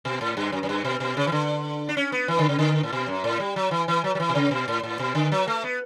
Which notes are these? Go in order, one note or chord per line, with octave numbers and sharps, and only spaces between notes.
B2
A2
G2
F#2
F#2
G2
B2
B2
C#3
E3
D3
D4
C#4
B3
E3
D3
C#3
D3
A2
B2
F#2
A2
G3
F#3
E3
E3
F#3
F#3
E3
B2
C#3
B2
A2
A2
B2
D3
F#3
A3
B3